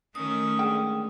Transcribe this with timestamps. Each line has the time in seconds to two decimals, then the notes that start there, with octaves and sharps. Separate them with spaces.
0.15 D#3 A3 C#4 D#6
0.59 D3 G#3 G5